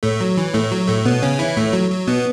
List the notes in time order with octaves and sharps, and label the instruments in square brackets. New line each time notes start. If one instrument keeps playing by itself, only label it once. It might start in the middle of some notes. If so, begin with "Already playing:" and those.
[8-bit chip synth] A2 A3 [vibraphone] C#5
[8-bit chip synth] F#3
E3
A2 A3
F#3
A2 A3
B2 B3
C#3 C#4
[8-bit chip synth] E3 E4 [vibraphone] C#5
[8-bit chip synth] A2 A3
F#3
F#3
[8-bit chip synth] B2 B3 [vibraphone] B4